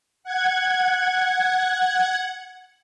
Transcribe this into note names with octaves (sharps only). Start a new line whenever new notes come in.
F#5 G#6